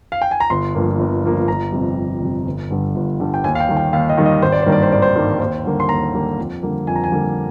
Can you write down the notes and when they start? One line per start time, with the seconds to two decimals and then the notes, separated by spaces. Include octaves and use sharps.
0.12 F5
0.22 G5
0.31 G#5
0.40 A#5
0.50 G1 C6
0.75 G2 F3 A#3
0.99 G1
1.24 G2 F3 A#3
1.48 G1 A#5
1.72 F2 C3 G3
1.97 G1
2.21 F2 C3 G3
2.46 G1
2.70 G2 D3 G3
2.95 G1
3.20 G2 D3 G3
3.34 G5
3.44 D#2 G#5
3.55 F5
3.60 G5
3.69 D#3 G3
3.77 G5
3.93 D#2 F5
4.09 D#5
4.18 D#3 G3
4.26 D#5
4.42 G#1 C5
4.52 D5
4.62 G2 D#3 G3 A#3 C5
4.72 D5
4.83 C5
4.91 G#1 D5
5.02 C5
5.15 G2 D#3 G3 A#3
5.40 D#2 C5
5.65 D3 G3 A#3
5.80 C6
5.89 D#2 A#5
6.13 D3 G3 A#3
6.38 F2
6.63 D3 G3 A#3
6.87 F2 G#5
6.96 A#5
7.04 G#5
7.12 D3 G3 A#3